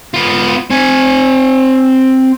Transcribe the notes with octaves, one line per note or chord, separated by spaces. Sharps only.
B3 F4
C4 G#5